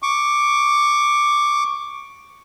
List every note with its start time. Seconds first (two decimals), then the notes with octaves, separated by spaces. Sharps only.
0.02 C#6 D6